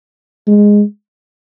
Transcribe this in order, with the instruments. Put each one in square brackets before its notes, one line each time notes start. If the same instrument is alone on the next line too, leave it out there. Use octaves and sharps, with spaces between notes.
[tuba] G#3